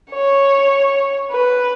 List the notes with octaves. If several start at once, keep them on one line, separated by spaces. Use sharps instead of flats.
C#5
B4